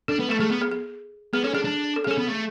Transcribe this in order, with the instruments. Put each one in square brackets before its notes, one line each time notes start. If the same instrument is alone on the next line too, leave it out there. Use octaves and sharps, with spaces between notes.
[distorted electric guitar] D4 [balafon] A4
[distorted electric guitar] B3
[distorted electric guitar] A3 [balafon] A4
[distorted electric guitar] A3 [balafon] G#4
[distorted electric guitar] B3 [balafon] G#4
[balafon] G#4
G#4
[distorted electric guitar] B3 [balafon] G#4
[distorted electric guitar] C#4 [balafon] A4
[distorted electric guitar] D4 [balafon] G#4
[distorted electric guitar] D4
[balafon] A4
G#4
[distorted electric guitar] C#4 [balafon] A4
[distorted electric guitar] B3
A3